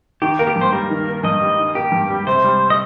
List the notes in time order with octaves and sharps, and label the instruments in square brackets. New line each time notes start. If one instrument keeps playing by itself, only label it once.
[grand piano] D#3 [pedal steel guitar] G4
[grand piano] A#3 [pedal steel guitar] A#4
[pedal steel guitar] G4
[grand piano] G2
[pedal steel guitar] C5
[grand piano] G3 [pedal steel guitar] A#4
[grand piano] D#3
A#3
[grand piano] G2 [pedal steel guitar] D#5
[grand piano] G3
D#3
[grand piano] A#3 [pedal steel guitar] G4
[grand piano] G2
G3
[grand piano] C3 [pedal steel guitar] C5
[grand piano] G3
[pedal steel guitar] D#5